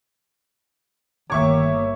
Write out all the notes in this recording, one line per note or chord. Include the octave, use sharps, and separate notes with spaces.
G1 D#3 A#3 C#5 E5 C#6 D6